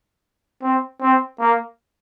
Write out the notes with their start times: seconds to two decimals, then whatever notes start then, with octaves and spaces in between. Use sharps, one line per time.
0.63 C4
1.01 C4
1.40 A#3